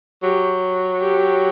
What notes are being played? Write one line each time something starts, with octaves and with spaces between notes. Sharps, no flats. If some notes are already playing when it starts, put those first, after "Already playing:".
F#3 G4
G4